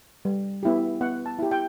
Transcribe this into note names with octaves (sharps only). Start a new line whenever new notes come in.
G3
B3 E4 G4
B3 F#5
A5
E4 G4
G5